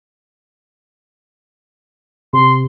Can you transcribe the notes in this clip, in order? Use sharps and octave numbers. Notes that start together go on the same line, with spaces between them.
C3 C6